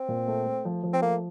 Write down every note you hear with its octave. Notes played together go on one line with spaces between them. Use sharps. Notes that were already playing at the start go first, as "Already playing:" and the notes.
Already playing: C4
A#2
A3
A3
F3
F3
C4
A3 A#3